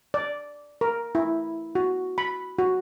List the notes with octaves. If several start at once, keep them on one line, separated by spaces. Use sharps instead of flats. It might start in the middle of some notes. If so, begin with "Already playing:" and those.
D5
A#4
E4
F#4
B5
F#4